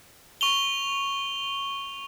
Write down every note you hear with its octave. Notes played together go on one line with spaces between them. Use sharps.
C#6 F7 G7